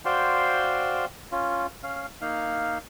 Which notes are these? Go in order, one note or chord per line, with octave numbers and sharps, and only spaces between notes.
F#4 C5 D5 F5 G5 C6
C#4 F4
C#4 F5
A#3 D#4 F5